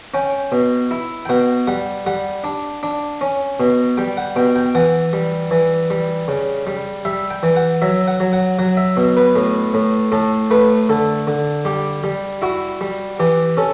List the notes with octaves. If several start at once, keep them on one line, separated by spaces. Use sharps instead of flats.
C#4 G5
B2
E4
G5
B2 F#5
G3 F#5
G3 F#5
D4
D4
C#4
B2
G3 G5
F#5
B2 G5
G5
E3 F#5
G3
E3
G3
C#3
G3
G3 E5
G5
E3
F#5
F#3 E5
F#5
F#3
F#5
F#3 F#5
E5
B2
B4
A2
A2
A2 A4
A3 B4
D3 A4
D3
G3 G4
G3
E4 F#4
G3
E3 G4
C#4 A4